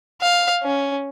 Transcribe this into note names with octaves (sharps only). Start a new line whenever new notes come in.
F5
C#4